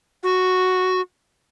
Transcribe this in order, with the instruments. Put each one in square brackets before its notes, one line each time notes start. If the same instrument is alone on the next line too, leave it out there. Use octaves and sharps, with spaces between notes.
[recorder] F#4